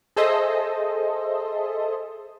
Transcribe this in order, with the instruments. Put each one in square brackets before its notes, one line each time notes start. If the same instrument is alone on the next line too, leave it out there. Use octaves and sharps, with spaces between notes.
[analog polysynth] G#4 A4 C5 D#5 E5